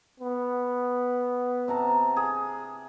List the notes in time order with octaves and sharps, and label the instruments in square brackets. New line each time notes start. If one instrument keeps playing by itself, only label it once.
[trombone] B3
[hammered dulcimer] C3 A5 A#5
G#4